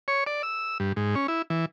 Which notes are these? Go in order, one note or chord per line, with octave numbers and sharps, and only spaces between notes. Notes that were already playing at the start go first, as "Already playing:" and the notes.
C#5
D5
E6
G2
G#2
C#4
E4
E3